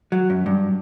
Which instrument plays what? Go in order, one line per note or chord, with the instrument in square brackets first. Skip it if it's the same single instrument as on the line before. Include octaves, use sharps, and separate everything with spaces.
[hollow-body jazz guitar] F#3
F#2
G2